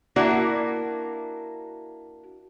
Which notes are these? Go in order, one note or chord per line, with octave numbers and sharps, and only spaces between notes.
A#3 D4 E4 F#4